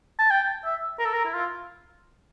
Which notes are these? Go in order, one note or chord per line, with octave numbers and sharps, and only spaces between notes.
A5
G5
E5
A#4
A4
A#4
E4
F4